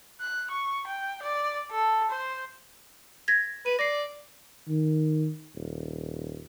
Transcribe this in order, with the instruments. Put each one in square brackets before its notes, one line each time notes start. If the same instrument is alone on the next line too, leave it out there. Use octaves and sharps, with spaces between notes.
[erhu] F#6
C#6
G5
D5
A4
C5
[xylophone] G#6 A#6 B6
[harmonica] B4 [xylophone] D#7
[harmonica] D5 [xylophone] A#6 C7
[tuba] D#3
D#1